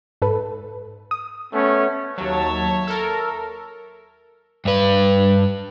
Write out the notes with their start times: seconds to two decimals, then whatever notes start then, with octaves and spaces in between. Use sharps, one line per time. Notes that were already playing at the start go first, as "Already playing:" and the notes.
0.22 G#2 A4 B4
1.11 D#6
1.52 A3 B3 C#4
2.18 D#2 F#3 C#5 E5 A5
2.87 A4 A#4
4.65 G2 B4